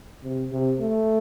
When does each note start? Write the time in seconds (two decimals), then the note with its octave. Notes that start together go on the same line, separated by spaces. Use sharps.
0.24 C3
0.51 C3
0.80 A3